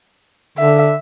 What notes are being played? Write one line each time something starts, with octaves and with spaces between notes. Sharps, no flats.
D3 E5